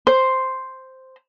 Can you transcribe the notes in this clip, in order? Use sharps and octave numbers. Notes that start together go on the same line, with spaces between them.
C5